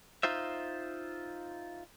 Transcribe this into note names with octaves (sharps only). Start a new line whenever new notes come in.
D#4 F4 C5 E5